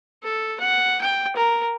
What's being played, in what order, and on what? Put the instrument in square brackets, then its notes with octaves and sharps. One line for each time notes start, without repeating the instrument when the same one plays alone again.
[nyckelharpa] A4
F#5
G5
A#4